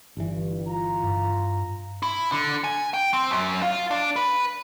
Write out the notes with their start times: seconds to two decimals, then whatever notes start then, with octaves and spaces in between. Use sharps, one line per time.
0.17 G1 G2 E3
0.67 F4 A#5
1.03 G2
2.03 E4
2.32 D3
2.64 G#5
2.94 G5
3.14 C4
3.30 F#2
3.62 F4
3.91 D4
4.16 B4